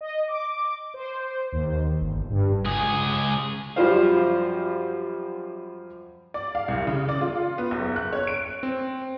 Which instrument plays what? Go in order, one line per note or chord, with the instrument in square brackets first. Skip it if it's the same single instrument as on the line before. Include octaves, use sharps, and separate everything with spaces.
[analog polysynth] D#5
D6
C5
D#2
G1
G2
[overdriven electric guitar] C#2 G#4
[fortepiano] F#2 F3 G3 F4 C5 F5
[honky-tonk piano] D5
F5
C2
C#3
D5
F4
B3
F#1
F#6
C#5
D7
[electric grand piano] C4